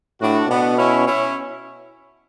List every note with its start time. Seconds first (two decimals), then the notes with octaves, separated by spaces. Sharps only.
0.21 A2 D4 F#4
0.49 B2 B3 D4
0.77 C#4 E4
1.05 C#4 E4